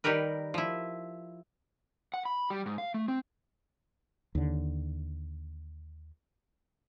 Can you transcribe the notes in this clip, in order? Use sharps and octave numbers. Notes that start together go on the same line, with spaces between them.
D#3 G3 G4 A#4 B4
F3 E4
F#5
B5
G3
G#2
F5
A3
C4
D#2 D3